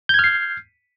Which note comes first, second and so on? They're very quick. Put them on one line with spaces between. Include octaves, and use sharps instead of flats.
G6 G#6 F6 C7